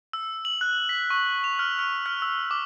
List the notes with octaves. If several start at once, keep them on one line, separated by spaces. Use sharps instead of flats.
E6
F#7
F#6
B6
C#6
F7
F6
F6
F6
E6
D6